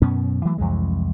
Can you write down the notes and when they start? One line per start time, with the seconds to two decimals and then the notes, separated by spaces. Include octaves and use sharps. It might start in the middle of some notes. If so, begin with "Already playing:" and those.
0.02 F#2 B2 B3 C#4
0.45 E3 F#3 A3
0.58 C2 F2 E3 G#3